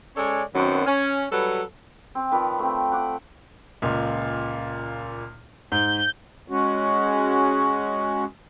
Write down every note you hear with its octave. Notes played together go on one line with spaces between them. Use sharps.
G#3 C#4 A4 C#5 D5
F#2 D#3 F#3 B3 C4
C#4
F#3 G3 A4 B4
C4
D#3 F3 B4 D5
A3 C4
F#5 D6
C#2 A#2
G#2 G6
G#3 C#4 F#4